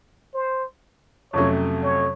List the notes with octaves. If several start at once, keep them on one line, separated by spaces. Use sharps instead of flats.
C5
F2 C3 F#3 A3 C#4 C#5
C#5